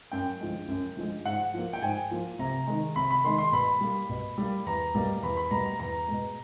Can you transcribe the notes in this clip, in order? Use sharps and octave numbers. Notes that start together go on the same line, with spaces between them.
F#2 G5
D3 F3 G#3
F#2
D3 F3 G#3
G#2 F#5
F3 A#3
G5
G#2 G#5
F3 A#3
C3 A#5
D#3 G#3
C3 B5
B5
D#3 G#3 C6
C6
B2 B5
G3 A#3
B2
G3 A#3
E2 A#5
B2 G3 A#3
E2 B5
B5
B2 G3 A#3 A#5
A#5
E2 A#5
B2 G#3